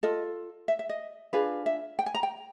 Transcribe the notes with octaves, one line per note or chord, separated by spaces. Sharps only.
F4 A4 D#5
E5
E5
D#5
D4 F4 G#4 B4
E5
G5
G#5
A#5
G5